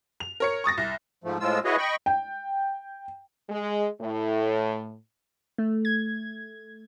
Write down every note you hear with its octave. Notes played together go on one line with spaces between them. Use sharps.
F7
A#4 C#5 C#7
C#6 D#6 A6 A#6
C2
G#2 F3 A3
A2 F3 G#3 F4 E6
E4 F#4 G#4 B4 C#5 D#5
D#5 G5 B5 C#6
G5
G#3
A2
A3
G#6